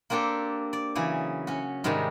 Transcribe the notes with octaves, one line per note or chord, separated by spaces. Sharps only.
A#3 C4 D4 G4 A4
D5
C#3 E3 F#3 G#4
C#4 F#4
G#2 C3 D#3 G3 G#3